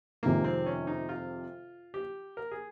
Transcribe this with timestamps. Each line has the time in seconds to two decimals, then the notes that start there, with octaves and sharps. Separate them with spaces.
0.23 F2 C3 D#3 G#3 A#3
0.44 C4
0.66 C#4
0.87 D#4
1.09 F4
1.94 G4
2.37 A#4
2.51 G#4